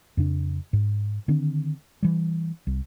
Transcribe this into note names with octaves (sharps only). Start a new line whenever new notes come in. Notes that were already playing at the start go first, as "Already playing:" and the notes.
F2 C#3 D4
G#2
D3 D#3 C4 D4
E3 G3
C2